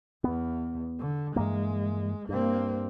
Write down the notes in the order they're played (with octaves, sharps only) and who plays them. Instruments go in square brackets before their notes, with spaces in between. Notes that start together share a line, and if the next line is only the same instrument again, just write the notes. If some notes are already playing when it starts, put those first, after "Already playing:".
[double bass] E2 [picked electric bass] B3
[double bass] D3
[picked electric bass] G2 E3 A#3 [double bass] G#3
[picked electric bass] G2 [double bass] A#3 C4